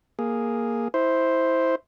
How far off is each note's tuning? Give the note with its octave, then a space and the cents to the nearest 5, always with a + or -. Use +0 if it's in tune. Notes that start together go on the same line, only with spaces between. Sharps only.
A#3 +0 G#4 +0
E4 -15 C5 +0